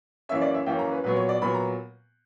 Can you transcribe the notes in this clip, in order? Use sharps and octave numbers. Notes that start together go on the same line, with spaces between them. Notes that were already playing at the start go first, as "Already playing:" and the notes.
F#2 E3 A#3 C#4 E5
D5
E5
F#2 E3 A#3 C#4 G5
A#5
B4
A#2 F#3 B3 B4
C#5
D5
A#2 F#3 B3 B5
A#5